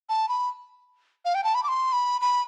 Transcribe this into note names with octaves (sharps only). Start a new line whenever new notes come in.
A5
B5
F5
G5
A5
B5
D6
C6
B5
B5